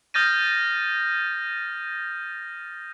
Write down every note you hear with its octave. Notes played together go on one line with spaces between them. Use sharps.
D#6 F6 G6 A6 A#6 D#7